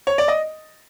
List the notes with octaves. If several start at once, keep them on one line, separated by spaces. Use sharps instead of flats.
C#5
D5
D#5